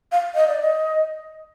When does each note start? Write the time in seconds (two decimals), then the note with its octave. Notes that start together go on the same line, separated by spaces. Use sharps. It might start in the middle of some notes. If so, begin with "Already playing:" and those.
0.12 F5
0.35 D#5
0.48 D5
0.61 D#5